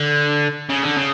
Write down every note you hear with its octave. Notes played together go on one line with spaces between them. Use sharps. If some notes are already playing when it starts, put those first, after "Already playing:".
Already playing: D3
C#3
D3
C#3